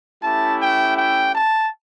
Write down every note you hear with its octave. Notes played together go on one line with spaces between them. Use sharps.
A3 C#4 E4 G4 A5
G5
G5
A5